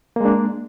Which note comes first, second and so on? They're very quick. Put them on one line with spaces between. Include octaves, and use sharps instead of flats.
A#3 G#3 D4